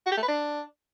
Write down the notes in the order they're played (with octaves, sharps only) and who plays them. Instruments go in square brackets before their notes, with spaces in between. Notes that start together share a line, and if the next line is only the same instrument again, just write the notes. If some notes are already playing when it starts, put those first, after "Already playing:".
[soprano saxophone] F#4
G4
A3
B4
D4